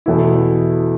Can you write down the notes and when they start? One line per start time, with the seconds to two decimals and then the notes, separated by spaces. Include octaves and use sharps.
0.06 E2 B2 A3 E4